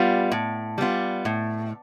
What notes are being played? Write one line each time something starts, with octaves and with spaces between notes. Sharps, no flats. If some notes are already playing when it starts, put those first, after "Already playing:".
Already playing: G3 B3 F4
A2
G3 B3 F4
A2